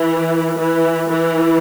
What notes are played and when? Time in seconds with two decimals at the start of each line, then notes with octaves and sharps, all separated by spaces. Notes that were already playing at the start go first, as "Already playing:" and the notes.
Already playing: E3
0.60 E3
1.10 E3